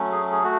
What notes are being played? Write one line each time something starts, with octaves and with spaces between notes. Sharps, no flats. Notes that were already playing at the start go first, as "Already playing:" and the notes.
Already playing: F#3 A3 C#4
G#4
G#4
A3 F#4